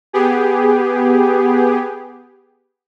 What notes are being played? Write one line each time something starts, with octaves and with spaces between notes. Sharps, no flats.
B3 G4 G#4